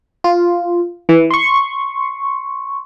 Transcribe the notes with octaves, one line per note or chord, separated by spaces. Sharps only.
F4
E3
C6 C#6